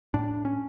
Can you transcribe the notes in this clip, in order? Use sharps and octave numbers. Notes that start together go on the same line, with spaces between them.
A2 D4
C#4